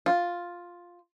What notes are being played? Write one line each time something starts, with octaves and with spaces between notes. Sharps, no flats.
F4